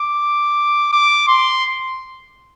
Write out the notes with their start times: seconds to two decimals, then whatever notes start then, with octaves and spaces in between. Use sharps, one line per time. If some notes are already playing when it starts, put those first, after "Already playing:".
Already playing: D6
0.93 D6
1.28 C6